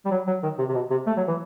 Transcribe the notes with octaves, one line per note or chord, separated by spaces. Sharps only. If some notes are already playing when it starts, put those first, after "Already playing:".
G3
F#3
F#3
D#3
C3
C3
B2
C3
A3
F#3
E3